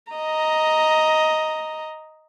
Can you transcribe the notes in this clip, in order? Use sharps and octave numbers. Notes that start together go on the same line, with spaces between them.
D#5 A#5